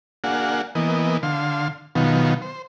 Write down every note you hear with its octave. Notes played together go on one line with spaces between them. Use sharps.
A#3 D4 F#4 G#4 F5 F#5
E3 A#3 B3 D#5
D3 F5 C6
B2 D#3 F#3 B3 F4
C5